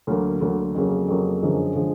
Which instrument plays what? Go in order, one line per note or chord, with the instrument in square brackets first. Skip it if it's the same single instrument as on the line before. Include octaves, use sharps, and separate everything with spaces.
[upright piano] D2 D3 F#3 A#3
D2 D3 F#3 A#3
F2 C#3 F#3 A#3
F2 C#3 F#3 A#3
F#2 D3 F3 G#3
D3 F3 G#3